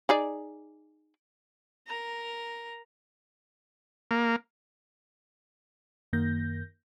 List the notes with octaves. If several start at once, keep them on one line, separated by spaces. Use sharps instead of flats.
D#4 G#4 D5
A#4 A#5
A#3
F#2 D#3 A#3 G6 A#6